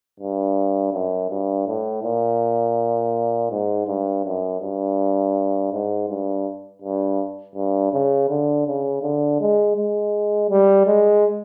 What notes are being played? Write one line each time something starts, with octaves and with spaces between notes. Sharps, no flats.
G2
F#2
G2
A2
A#2
G#2
G2
F#2
G2
G#2
G2
G2
G2
C#3
D3
C#3
D3
G#3
G#3
G3
G#3